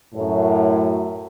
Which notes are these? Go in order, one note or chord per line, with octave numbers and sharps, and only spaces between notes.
F#2 A2